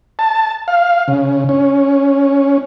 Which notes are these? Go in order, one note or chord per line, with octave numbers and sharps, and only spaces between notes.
A5
F5
C#3
C#4